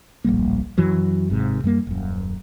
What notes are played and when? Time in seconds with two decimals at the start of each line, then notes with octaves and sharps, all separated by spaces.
0.24 D1 A#1 G3 A#3
0.78 F#2 E3 F#3
1.30 G#1 G#2 C3
1.64 F#2 G3 A#3
1.87 D#1 F#2